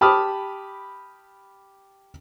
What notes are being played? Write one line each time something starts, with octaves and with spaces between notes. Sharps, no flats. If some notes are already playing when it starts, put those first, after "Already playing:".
G4 A5 B5 D6 D#6 F6